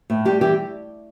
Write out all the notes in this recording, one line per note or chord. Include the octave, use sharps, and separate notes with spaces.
A2
G3 G4
E3 G4